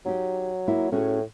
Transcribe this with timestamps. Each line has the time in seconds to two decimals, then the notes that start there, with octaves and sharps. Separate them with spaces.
0.06 F#3 D#4 G4
0.68 A#3 E4
0.92 A2 C#4 F#4 G#4